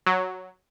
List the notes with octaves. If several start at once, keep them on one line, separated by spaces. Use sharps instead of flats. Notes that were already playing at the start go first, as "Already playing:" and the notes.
F#3